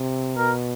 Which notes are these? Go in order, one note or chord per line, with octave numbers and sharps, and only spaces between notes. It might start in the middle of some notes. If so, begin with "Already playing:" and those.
Already playing: C3
B2 A#4